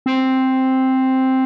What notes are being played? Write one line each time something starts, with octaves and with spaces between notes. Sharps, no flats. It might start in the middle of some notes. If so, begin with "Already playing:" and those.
C4